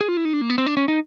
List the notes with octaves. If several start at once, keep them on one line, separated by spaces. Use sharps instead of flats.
G#4
F4
E4
D#4
D4
A#3
B3
C4
D4
C#4
D#4